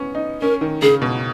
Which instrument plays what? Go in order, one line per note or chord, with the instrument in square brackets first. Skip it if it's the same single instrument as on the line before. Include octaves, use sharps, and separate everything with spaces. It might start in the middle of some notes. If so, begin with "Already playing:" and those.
Already playing: [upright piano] B3 C#4
D#4
[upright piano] C#4 [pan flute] A#4
[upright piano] D#3
[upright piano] C#3 [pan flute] G#4
[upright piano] B2